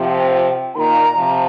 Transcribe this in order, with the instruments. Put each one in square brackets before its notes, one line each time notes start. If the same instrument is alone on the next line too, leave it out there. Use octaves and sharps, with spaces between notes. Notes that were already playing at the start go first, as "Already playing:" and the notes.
Already playing: [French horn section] C3 F3 [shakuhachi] G5
[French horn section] A#2 D#3 [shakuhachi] A#5 C6
[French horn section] C3 F3